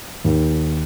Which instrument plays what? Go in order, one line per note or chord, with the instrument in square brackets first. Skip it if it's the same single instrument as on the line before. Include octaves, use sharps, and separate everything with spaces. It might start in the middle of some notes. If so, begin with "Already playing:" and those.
[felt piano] D#2